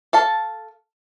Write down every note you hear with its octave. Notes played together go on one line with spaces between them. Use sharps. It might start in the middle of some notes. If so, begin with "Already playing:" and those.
A4 F5 A5